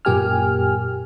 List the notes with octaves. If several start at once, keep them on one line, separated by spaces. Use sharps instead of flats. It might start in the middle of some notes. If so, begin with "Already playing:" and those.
F#2 A#2 A#3 G4 G#5 F6